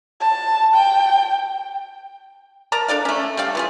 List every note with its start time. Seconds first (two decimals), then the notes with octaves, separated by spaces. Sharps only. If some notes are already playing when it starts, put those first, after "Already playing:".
0.21 A5
0.74 G5
2.72 A#4 D5 A5 A#5
2.88 D4 A4 D5 F5
3.05 A3 C#4
3.37 G3 A3 D5 F5
3.55 E3 F4 G#4